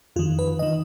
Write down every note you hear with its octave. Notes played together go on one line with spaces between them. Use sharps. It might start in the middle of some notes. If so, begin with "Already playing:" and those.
F2 D#3 F4
B4
D#3 D#5